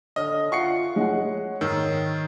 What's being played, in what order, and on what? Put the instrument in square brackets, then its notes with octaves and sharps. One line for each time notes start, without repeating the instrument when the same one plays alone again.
[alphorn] D3 [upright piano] C#5 D#6 F6 [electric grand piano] D#5
[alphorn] F4 [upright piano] E5 F#5 [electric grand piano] C#6 C7 C#7
[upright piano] G#3 E4 F#5 [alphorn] C#5
[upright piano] G#2 E6 F6 [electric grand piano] D#3